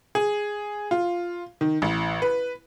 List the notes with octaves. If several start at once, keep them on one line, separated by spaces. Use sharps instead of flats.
G#4
F4
D#3
A1
B4